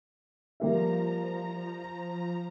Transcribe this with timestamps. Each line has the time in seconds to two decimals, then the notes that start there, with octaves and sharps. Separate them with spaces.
0.60 F3 G3 A#3 E5 A#5